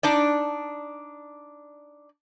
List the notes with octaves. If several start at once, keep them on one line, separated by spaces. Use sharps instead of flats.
D4 D#4 D5